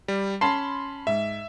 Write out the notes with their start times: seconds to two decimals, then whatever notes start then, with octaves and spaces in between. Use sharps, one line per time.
0.08 G3
0.41 C#4 A5 B5 C6 C7
1.07 G#2 E5